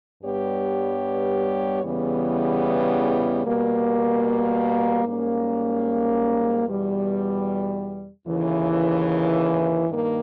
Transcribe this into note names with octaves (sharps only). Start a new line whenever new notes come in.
G2 G3 B3 G4 C#5
E2 C#3 E3 G3 B3
B2 G3 A#3
G#2 G3 A#3 C#4
E2 B2 G3
D#2 C#3 E3
G2 D#3 A#3